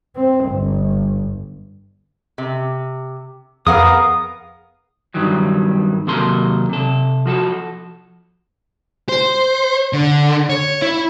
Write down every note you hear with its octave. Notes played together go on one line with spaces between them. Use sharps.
C4
G1
C3
F2 B3 G#4 A#4 F5 F#5 D#6
G2 D#3 E3 F#3 G3
D#2 C3 F#3 A4 A#4 C6
C3 A4
F3 F#4 A4
C5
D3
C#5
E4